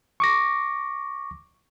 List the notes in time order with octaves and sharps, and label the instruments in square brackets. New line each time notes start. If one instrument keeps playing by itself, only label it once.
[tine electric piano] C#6 D6 A#6